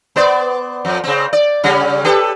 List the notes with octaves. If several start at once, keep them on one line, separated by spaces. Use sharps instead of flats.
B3 C5 D5
F2
C#3 C4
D5
C#3 G3 C#4
G4 A4 B4